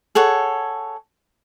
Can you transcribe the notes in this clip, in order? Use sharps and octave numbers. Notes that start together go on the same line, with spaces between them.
G#4 A4 C#5 F#5